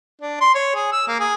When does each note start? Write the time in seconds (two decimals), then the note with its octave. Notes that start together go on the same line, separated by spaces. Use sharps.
0.21 D4
0.41 C6
0.54 C#5
0.75 G#4
0.92 E6
1.08 A#3
1.20 G#4